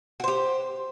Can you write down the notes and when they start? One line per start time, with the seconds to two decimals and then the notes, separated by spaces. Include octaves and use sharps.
0.20 F#4
0.24 C5
0.28 G4